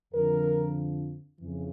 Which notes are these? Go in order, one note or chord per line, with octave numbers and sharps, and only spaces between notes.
F2 D3 F3 A#4
F2 C#3 E3